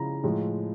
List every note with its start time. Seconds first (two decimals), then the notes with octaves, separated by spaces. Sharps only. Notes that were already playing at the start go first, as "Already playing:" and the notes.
Already playing: C#3 F3 G#3 E4 A#5 B5
0.24 A2 F3 G#3